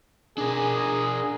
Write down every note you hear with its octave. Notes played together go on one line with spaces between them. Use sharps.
D4 G#4 A#4